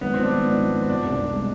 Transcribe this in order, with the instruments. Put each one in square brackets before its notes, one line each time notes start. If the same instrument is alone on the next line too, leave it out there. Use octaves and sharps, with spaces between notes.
[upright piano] G#1 [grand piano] B3
[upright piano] F3 [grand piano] C4
[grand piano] D4
[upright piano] B3
G#2
F3
G#2
[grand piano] C4
[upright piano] B2 [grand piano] D4
[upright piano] C2
C2
G#3